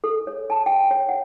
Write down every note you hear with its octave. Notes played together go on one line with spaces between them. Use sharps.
A4
C#5
A5
G5
C#5
F#5